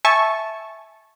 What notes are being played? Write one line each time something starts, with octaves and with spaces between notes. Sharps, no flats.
E5 G#5 A5 C#6